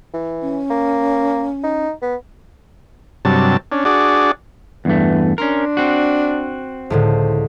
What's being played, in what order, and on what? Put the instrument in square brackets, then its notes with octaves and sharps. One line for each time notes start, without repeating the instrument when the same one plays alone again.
[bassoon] E3
[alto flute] C#4
[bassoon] A#3
D#4
B3
[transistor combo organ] G2 C3 F#3 A5
C#4 D4
D4 F#4 G#4 D5
[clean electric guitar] E2 G2 A3 [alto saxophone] B4
[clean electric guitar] C#4 A#4 [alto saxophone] D4 [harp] C6 A#6
[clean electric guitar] C4 F#4
[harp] C#2 A2 D3 [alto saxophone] C5